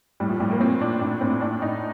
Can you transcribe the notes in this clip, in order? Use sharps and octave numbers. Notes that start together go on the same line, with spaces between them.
A2 G3
F3
A2 G3
A#3
A#2 C4
A#2 D4
A2 D4
A2 C4
A2 D4
A2 D#4